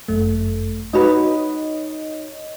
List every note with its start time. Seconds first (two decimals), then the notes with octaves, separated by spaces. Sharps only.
0.08 G1 F#2 A3
0.93 D#4 F#4 B4 C#5 D#5